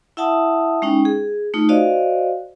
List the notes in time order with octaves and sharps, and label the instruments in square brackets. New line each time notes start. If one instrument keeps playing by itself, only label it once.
[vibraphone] E4 E5 F#5 A5 D#6
G#3 C#4 D#4 G5
G#4
A3 D#4 F4
F#4 C5 D5 D#5 F5